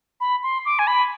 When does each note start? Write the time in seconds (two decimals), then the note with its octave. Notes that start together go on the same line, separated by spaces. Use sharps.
0.21 B5
0.43 C6
0.65 D6
0.79 G#5
0.87 B5